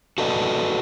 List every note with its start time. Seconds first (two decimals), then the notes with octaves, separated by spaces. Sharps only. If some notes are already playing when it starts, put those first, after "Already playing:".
0.18 F#4 A4 B4 D5 D#5